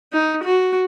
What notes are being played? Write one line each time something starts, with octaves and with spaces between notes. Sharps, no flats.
D#4
F#4